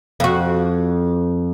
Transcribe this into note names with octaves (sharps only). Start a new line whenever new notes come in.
F2 F#4